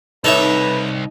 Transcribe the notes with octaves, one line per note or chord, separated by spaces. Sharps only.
C2 D#4 A4 B4 C#5 E5